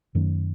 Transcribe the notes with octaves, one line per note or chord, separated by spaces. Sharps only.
F#2 D#3 A3 C#4